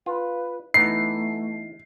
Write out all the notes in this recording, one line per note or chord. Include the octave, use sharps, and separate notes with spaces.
F4 B4
E3 A3 B3 D#4 C7